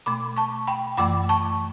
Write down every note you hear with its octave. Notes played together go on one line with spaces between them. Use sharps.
B2 A3 B5 D6
A5 C#6
G5 B5
F#2 E3 A3 B5 D6
A5 C#6